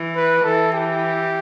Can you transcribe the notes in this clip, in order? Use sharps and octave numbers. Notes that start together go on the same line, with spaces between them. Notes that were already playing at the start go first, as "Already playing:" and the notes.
Already playing: E3
B4
E3 A4
G4